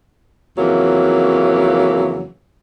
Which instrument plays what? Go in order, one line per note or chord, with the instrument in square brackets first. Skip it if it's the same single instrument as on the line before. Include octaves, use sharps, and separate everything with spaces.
[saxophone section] F2 C#3 E3 F#3 A#3